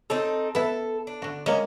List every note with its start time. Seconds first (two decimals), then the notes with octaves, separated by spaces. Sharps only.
0.10 C4 D#4 A4 C#5
0.55 B3 E4 A4
1.07 D4
1.22 D3 F#4
1.46 G#3 A#3 C#4